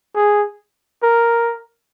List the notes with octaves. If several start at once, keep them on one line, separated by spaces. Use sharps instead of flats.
G#4
A#4